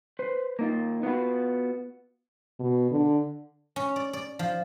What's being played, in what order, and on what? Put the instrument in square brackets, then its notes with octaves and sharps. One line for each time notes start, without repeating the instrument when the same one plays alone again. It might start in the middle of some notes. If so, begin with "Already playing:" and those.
[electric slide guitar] B4 C5
A#3 D#4 F4
B3 F4 F#4 B4
[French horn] B2
D3
[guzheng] C#4
D5
D5
F3